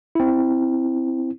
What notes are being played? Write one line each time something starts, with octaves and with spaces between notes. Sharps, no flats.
C4 E4